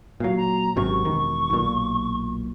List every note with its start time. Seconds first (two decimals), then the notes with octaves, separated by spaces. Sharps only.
0.20 A#2 F#3 F5
0.37 A#5
0.76 G#1 F#2 C3 C#6
1.05 E1 D#3
1.50 B1 A#2